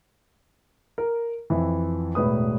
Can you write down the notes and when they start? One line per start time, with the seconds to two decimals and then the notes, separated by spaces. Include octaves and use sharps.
0.98 A#4
1.50 F2 E3
2.15 E1 A2 B4 D#6